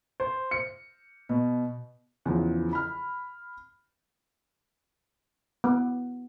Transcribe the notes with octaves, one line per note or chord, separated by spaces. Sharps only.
C5
C#7
B2
E2 C#3 F3
B5 F6
B3